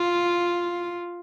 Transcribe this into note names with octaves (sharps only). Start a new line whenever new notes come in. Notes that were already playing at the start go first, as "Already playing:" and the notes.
Already playing: F4